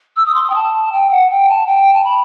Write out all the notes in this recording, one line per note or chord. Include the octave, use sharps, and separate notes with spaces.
E6
D#6
C6
D#6
G5
A5
G5
F#5
G5
A5
G5
A5
B5